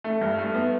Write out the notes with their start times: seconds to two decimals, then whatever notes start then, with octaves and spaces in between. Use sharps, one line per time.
0.04 A3
0.21 G2
0.39 A3
0.54 B3